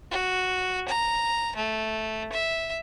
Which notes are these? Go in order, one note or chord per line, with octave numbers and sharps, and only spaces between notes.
F#4
A#5
A3
E5